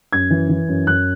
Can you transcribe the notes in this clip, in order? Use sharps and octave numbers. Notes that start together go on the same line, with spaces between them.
F#2 G#6
E3
E3
F#2
F#2 F#6